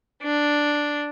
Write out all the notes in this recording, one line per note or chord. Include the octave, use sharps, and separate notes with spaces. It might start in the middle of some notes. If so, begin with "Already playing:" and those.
D4